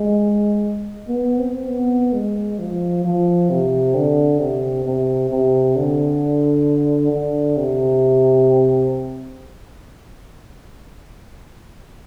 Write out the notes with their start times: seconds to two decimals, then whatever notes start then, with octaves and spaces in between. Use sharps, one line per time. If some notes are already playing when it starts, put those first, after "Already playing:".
Already playing: G#3
1.08 B3
1.39 C4
1.68 B3
2.13 G#3
2.59 F3
3.05 F3
3.50 C3
3.95 D3
4.40 C3
4.85 C3
5.30 C3
5.76 D3
7.12 D3
7.57 C3